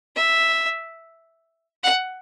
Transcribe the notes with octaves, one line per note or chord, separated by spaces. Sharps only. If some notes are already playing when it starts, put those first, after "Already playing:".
E5
F#5